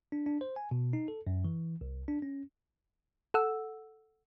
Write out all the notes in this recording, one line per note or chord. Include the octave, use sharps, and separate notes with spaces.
D4
D4
C5
G#5
B2
D#4
A4
F#2
E3
C2
D4
C#4
A4 F#5 E6